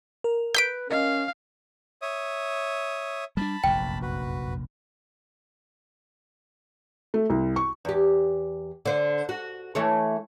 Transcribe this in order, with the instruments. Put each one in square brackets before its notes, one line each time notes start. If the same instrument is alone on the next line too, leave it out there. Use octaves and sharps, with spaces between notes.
[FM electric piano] A#4
[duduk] B4 [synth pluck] G6 B6 D7
[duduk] C#4 [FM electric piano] A#4 D#5 [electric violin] F5
[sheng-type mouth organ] C#5 E5 D#6
[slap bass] G3 A3 D4 [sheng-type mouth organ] A5 B5
[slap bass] F1 A#1 F#2 [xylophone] G5
[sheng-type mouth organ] F#4 B4
[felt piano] A3
C2
C#6
[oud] E2 G4
D3 C5 D5
F#4
E3 A3 C#5